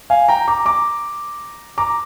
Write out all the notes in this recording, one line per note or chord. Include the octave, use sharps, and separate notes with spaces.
F5 G#5
G5 A#5
A#5 D6
A#5 D6
A#5 D6